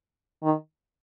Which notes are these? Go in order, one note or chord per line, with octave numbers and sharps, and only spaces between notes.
D#3